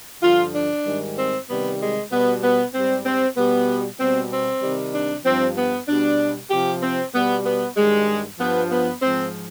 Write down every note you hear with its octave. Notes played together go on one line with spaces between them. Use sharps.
G2 D3 F3 F4
D4
G#2 D#3 G3
C4
C3 D#3 G3 B3
G#3
B2 G3 B3
B3
G#2 G3 C4
C4
B2 G3 B3
B2 G3 C4
C4
C3 D#3 G3
D4
G2 F3 C4
B3
B2 G3 D4
C3 F3 G4
C4
B2 G3 B3
B3
G2 D#3 G3 G#3
G2 F3 B3
B3
G#2 F3 C4